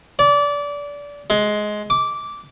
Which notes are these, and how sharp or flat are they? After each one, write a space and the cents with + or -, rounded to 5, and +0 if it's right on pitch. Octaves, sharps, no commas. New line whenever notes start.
D5 -25
G#3 +15
D6 -10